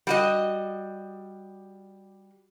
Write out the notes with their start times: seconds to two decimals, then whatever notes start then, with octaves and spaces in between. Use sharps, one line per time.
0.07 G3 F#4 D#5